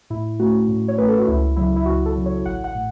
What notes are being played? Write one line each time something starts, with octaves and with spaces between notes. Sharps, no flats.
A2 E4
A3 C#4 F#4
A2
C#5
A3 C#4 B4
A4
F#4
C#2 E4
C#3 F#3 E4
E4
C#2 F#4
A4
C#3 F#3
C#5
A1 F#5
F#5
A2